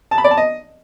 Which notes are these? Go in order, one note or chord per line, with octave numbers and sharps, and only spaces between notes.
A5
B5
D5
A5
D#5